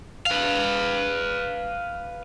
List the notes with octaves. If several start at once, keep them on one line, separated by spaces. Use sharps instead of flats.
B4 F5